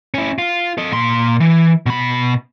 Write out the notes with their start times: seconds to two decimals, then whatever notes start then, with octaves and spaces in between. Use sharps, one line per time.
0.14 C#4 E4
0.38 F4
0.78 A4 D#5
0.92 A#2 C6
1.40 E3
1.86 B2 B5